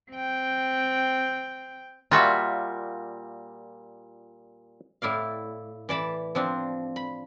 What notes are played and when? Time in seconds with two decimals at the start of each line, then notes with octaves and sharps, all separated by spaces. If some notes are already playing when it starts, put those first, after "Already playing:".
0.11 C4 G5
2.11 A#2 G3 F4 F#4 E5
5.02 A2 E4 D5 F5
5.89 E3 D5 A5 B5
6.35 F3 C4 D4
6.96 B5